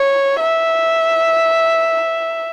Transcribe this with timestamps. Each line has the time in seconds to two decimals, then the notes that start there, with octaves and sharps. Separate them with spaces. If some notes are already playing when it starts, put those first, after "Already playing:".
Already playing: C#5
0.40 E5